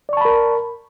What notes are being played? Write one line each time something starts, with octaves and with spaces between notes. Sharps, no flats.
A#4 D5 A5 B5 C#6